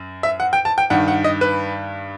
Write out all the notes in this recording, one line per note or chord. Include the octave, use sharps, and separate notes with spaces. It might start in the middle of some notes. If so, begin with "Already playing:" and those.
Already playing: F#2
E5
F#5
G5
A5
G5
G2 D#3 F#5
F#5
D#5
B4